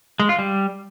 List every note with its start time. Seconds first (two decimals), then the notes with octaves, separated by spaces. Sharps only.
0.20 G#3
0.29 F4
0.39 G3